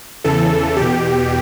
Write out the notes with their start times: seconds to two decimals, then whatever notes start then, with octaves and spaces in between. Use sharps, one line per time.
0.24 E2 C#3 E3 A4
0.77 E2 B2 G4